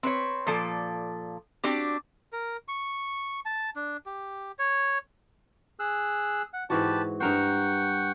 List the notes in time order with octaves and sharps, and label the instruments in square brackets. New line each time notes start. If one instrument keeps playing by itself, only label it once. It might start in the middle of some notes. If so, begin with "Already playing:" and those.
[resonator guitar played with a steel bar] C4 B4 C#5
A#2 F3 A4 D5
C4 D4 F#4 G4
[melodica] A#4
C#6
A5
D4
G4
C#5
[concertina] G#4 E6 F#6
F#5
[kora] G#2 E3 F#4 [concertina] G4 B4 A5
[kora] G2 A#4 C5 [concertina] F#5 G5 C#6